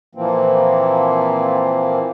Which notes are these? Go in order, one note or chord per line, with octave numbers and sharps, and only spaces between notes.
A#2 E3 F3 A#3 C4